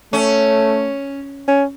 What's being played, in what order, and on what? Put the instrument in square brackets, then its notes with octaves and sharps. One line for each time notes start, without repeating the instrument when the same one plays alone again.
[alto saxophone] A3 [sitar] C#4
[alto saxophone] C#4